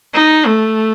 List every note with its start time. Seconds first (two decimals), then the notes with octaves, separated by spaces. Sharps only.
0.14 D#4
0.46 A3